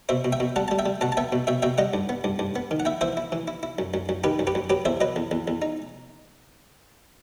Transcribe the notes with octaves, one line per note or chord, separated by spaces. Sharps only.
B2 C5 E5
B2
E5 G5
B2
G3 F#5 A5
G3 A5
E5 G5
G3
B2 F#5 A5
A5
B3 E5 G5
B2
B2 E5 G5
B2 E5 G5
G3 D#5 F#5
G2
B3
G2
G2
B3
D#3
F#5
E4 E5 G5
E3 C5 E5
E4
E3
E4
E4
F#2
F#2
F#2
D#3 G4 B4
F#2
G4 B4
F#2
F#3 G4 B4
E2 C5 E5
F#3 B4 D#5
E2
E2
E2
D#4